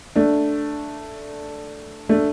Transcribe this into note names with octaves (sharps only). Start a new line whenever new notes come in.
A3 D4
A3 D4